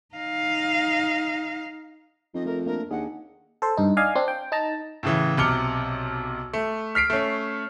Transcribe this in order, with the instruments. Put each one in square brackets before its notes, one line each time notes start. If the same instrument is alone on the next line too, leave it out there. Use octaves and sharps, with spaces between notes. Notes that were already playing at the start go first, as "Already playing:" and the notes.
[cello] D#4 F5
[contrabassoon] F2 [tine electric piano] D#4 [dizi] D#5
[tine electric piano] A3 [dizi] A#4
[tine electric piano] A3 A#3 D4 [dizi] A#4
[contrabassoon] D#2 [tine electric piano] D4 G#4 [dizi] F#5
[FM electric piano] A4 C5
G2 D#4
D5 D#5 F5 G#5
C4 D4 C6
G5
D#4 A5 A#5
[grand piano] A2 C#3 E3
B1 C3 D6 F6 C#7 G7
A3
F6 B6 C7 D7
A3 C#4